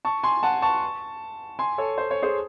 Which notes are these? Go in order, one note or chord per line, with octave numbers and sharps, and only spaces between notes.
A5 C#6
G#5 C6
F#5 A5
A5 C#6
G#5 C6
A4 C#5
C5
C#5
G#4 C5